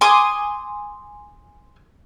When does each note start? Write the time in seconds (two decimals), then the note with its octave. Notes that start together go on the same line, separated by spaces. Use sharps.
0.01 G#5 C6 D6 D#6